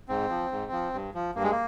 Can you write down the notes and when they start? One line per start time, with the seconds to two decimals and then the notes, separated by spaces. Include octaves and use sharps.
0.08 G#2 C4
0.29 F3
0.52 G#2
0.72 F3
0.94 G2
1.14 F3
1.35 G2 A#3
1.43 G#3
1.51 A#3